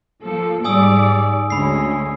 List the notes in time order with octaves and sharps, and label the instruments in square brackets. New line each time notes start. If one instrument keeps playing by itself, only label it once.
[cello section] F3 A#3 A4
[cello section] G#2 G3 D5 [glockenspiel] G#5 D#6 E6
[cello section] D2 G#3 C#4 [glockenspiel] B5 C7